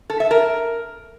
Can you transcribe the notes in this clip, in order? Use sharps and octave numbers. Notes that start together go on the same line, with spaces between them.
A4
E5
A#4